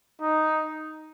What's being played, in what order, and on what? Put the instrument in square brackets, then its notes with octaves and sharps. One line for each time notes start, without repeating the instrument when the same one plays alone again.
[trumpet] D#4